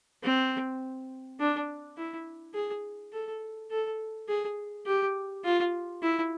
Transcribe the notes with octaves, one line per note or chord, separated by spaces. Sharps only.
C4
D4
E4
G#4
A4
A4
G#4
G4
F4
E4